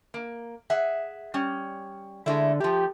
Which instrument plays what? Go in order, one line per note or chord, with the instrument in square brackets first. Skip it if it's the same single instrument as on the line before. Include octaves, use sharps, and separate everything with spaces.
[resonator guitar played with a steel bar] A#3
G#4 E5 F#5
G3 C#4
[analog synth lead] D3 [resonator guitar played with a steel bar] G#3 A3 E4
[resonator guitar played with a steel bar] F3 A3 [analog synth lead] G4